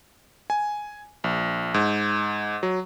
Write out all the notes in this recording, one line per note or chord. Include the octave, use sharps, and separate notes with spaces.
G#5
A#1
G#2
F#3